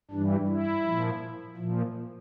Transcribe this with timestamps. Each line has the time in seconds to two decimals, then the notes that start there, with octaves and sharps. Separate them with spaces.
0.11 G2 E3 G3 D4
0.48 E4
0.84 A#2 F3
1.57 A#2 F3